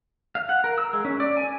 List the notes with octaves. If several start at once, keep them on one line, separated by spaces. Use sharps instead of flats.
F5
F#5
A#4
E6
G#3
C#4
D5
G#5